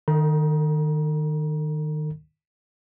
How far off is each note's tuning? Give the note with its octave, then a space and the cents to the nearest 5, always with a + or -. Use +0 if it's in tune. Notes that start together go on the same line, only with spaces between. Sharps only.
D#3 -20 A4 +40 A#5 +30